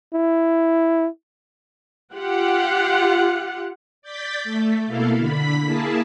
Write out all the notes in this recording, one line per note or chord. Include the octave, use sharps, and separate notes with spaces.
E4
F4 G4 F#5
D5 G6 A6 B6
A3
B2 A#3 E4 A4 F5
D3 B5 B6
A#3 E4 G#4 A5